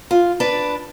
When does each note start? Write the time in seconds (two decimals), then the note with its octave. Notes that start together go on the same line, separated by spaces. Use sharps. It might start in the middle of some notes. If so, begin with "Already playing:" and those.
0.11 F4
0.40 D4 B4 D5